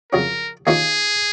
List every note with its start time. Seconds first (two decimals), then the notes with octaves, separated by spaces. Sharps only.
0.12 F2 C#3 F#3 C#4 A#4
0.67 D#2 D#3 A#3 C#4 F4 G#4